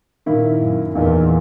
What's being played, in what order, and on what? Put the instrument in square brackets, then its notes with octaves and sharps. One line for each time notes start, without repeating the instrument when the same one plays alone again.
[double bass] A#2 [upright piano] D#3 A#3 E4
[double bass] F#2
[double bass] E2 [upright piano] A#2 A#3 D#4